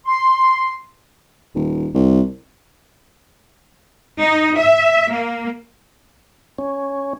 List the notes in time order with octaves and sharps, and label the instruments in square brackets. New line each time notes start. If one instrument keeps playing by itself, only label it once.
[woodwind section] C6
[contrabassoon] D#1
C2
[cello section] D#4
E5
A#3
[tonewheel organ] C#4